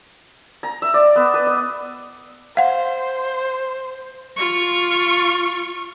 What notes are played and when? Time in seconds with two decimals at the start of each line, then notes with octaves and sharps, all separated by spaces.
0.63 A#5
0.82 E5
0.94 D5
1.16 B3
1.34 B4
1.47 D#5
2.57 C5 F5 F#5
4.37 F4 C#6